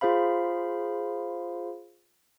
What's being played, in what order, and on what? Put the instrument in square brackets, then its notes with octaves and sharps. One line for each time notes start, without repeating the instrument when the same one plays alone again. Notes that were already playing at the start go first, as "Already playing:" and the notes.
[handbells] F4 G#4 C5 F5 B5